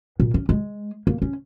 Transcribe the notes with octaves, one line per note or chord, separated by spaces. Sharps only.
A#2
C#4
G#3
A#3
C#4